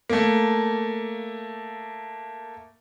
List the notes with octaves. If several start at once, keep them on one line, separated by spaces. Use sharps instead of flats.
A3 A#3